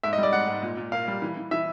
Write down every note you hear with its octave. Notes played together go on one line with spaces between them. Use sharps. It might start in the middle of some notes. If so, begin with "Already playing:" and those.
G#2 E5
D#5
G3 D5
G#2 F#5
G#2
A#2
A#2
A#3 F5
G3
E3
E3
E3 E5